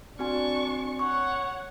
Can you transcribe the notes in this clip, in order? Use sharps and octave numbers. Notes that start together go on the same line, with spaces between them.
C4 D4 F#4 G#5 C#6
C#5 F#5 C#6